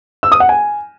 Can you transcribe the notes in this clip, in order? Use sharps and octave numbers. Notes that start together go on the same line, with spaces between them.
E6
D#6
F#5
G#5